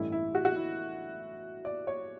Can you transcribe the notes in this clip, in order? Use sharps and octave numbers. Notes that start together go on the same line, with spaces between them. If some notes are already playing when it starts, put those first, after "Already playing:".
Already playing: A1 G2 E3 A3 E4
E4
F#4
F#4
E4
D5
C#5